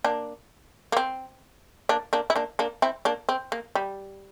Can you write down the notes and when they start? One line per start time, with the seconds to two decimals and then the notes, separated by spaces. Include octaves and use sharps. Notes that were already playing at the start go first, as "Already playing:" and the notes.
0.04 A#3 D4
0.92 A#3
0.97 C4
1.89 A#3 D4
2.13 A#3 D4
2.30 E4
2.36 A#3 D4
2.59 A#3 D4
2.82 C4 E4
3.05 A#3 D4
3.29 C4
3.52 A#3
3.75 G3